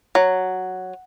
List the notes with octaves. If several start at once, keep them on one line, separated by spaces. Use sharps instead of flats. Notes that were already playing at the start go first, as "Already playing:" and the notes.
F#3